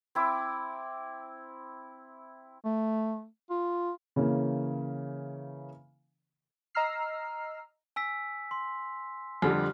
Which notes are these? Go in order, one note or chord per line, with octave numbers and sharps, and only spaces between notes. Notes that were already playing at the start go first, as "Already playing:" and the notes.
C4 E4 D6
A3
F4
C#3 E3 A#3 C#4
D#5 A#5 E6 F6 C7
G#5 E6 B6
C6
F2 D3 G3 F6